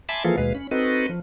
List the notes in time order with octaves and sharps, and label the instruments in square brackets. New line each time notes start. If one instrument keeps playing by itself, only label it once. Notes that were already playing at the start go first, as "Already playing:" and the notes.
[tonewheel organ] E5 G#5 A5 B5 C6 D6
E3 F3 A#3 F4 G#4 A4
D#2 B2 G#3 B4 F5
C#4 B5
C4 D#4 F#4 A4 B4 D#5
F3